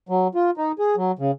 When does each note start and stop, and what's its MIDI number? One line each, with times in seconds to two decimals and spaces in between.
0.09 0.28 54
0.35 0.51 65
0.58 0.72 63
0.79 0.95 68
0.97 1.12 54
1.19 1.31 49